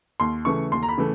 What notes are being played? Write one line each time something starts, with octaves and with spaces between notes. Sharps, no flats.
D#2 C6
C#3 E3 A3 C#6
D#2 C6
A#5
B5
C#3 E3 A3